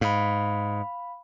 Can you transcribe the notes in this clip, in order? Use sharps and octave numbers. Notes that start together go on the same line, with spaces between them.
G#2 F5 B5